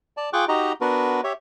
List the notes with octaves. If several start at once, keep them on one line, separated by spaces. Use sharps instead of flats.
D5 A5
F4 G#4 G5 C#6 D6 F#6
D#4 F#4 G4 D#5 A#5
B3 D4 F#4 A#4 B4
G4 C#5 E5